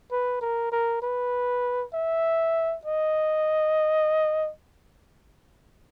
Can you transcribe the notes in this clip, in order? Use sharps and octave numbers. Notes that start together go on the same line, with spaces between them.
B4
A#4
A#4
B4
E5
D#5